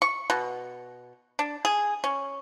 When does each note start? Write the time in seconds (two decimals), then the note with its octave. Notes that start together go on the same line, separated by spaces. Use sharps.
0.02 C#6
0.30 B2
1.39 D4
1.65 G#4
2.04 C#4